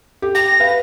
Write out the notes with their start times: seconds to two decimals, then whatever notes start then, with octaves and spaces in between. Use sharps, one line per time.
0.22 G4
0.35 G5 A#6
0.60 B4 F5